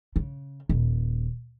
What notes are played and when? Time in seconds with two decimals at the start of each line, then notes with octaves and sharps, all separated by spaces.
0.16 C#3
0.69 D#1